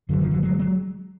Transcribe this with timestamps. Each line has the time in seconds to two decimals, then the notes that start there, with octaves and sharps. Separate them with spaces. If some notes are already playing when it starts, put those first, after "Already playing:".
0.09 F#1 F#2 D3 F#3
0.20 D#3 F3
0.31 E3 F#3
0.43 F#3 G#3
0.59 F#3 G#3